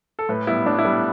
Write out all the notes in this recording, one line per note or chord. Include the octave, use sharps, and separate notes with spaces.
A4
A2 B4
G3 B3 E4
A2 D4
E4
G3 B3